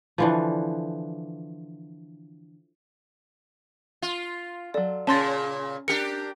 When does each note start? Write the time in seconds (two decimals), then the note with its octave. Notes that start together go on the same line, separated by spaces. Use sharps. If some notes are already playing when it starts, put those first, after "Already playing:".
0.18 D3 E3 F3
4.02 F4
4.74 F#3 A4 D5
5.07 A#2 C#3 C#4 A5 C6 A6
5.88 D4 G4 A#4 C#7